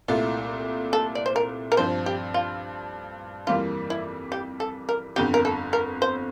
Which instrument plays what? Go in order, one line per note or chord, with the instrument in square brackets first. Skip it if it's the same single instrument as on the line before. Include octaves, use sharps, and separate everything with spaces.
[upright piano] C2 A#2 A3 E4 [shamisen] F4
[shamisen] A4
D5
C5
A#4
A#4
[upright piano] G2 F3 C4 [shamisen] C5
[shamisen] G4
F4
[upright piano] F2 E3 G3 A#3 [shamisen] F4
[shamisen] E4
G4
A4
A#4
[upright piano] G1 F2 D3 [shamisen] G4
[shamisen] A#4
A4
A#4
C5